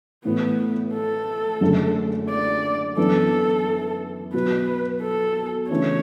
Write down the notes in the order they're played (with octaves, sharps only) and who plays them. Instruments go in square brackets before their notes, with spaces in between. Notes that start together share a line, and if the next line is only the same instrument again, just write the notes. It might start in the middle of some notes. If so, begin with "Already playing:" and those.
[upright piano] A2 E3 A3 E4 B4 [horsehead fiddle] B3
[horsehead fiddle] A4
[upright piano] F#1 F#2 D3 A3
[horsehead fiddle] D5
[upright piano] F#2 E3 B3 D4 [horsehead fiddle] A4
[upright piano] B2 F#3 B3 F#4 [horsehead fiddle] B4
[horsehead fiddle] A4
[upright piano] C#3 E3 A3 D4 [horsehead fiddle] C#5